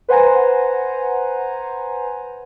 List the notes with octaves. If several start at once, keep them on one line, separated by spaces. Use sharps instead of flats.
B4 C5 F#5 G#5 A#5